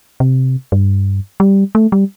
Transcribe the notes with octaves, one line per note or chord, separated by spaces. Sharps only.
C3
G2
G3
A3
G3